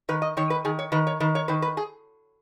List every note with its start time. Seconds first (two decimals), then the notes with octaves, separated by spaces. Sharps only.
0.09 D#3 B4
0.22 D#5
0.37 D#3 C#5
0.50 B4
0.65 D#3 G#4
0.79 C#5
0.92 D#3 B4
1.07 C#5
1.20 D#3 B4
1.35 C#5
1.48 D#3 B4
1.62 B4
1.77 G#4